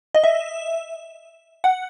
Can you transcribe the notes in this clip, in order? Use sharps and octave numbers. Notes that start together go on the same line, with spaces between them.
D#5
E5
F#5